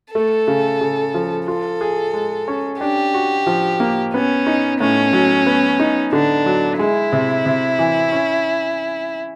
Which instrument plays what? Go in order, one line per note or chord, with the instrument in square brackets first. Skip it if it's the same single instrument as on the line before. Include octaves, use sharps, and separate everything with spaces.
[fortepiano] A3 [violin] A4
[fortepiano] C#3
C#3
F3
[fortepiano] F4 [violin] A4
[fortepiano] G#4
G#3
C#4
[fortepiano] D4 [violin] G4
[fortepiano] F#4
F3
A#3
[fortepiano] B3 [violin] C#4
[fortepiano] D#4
[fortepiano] A2 [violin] C#4
[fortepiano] F#3
B3
D#4
[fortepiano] D3 [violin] D4
[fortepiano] F#3
[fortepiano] G#3 [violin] E4
[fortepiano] C3
C3
E3
C#4